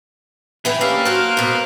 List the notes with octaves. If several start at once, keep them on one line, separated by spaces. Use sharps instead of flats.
E3 G#4 B4 G5
A3 C#4 D4 G4 A#4 B4 F5
F#3 C5 A5 F6 F#6
G#2 B2